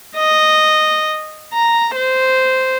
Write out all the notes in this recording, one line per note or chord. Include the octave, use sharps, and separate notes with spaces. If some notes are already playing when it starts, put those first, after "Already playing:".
D#5
A#5
C5